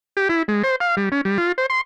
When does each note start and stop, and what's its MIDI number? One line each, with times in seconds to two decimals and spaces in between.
0.17 0.28 67
0.29 0.43 64
0.48 0.63 56
0.64 0.76 72
0.80 0.95 77
0.97 1.09 55
1.12 1.21 61
1.25 1.38 55
1.38 1.52 65
1.58 1.66 72
1.70 1.81 84